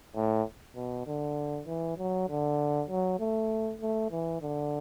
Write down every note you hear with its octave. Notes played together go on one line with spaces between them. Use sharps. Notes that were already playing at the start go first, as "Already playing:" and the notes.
A2
B2
D3
E3
F#3
D3
F#3
A3
A3
E3
D3